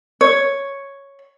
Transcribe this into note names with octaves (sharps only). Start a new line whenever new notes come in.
C#5